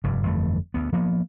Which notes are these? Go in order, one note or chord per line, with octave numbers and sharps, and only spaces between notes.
F1 G2
G1 F2 E3 A3
D2 B3
F3 A#3 B3